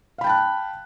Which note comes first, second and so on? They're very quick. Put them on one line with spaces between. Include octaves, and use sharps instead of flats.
F5 B5 G5 A5 F#6